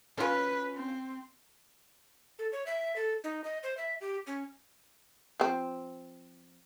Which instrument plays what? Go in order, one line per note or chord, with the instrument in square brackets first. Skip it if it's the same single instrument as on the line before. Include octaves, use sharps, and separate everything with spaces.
[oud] C#4 F4 [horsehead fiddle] B4
[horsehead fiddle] C4
[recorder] A4
C#5
E5
A4
D#4
D#5
C5
E5
G4
C#4
[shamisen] F3 C4